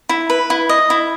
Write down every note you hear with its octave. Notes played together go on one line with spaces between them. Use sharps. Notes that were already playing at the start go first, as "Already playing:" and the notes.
E4
B4
E4
D#5
E4